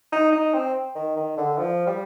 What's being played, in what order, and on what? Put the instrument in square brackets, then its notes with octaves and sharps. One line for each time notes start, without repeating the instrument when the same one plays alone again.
[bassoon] D#4
D#4
C4
D#3
D#3
D3
F3
G3